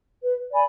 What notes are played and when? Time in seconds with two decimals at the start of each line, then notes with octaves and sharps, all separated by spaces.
0.22 B4
0.51 D5 G#5 B5